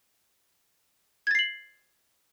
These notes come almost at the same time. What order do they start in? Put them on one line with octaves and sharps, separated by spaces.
G#6 A6 C7 F#7